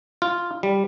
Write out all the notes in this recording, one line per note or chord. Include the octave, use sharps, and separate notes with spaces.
F4
G3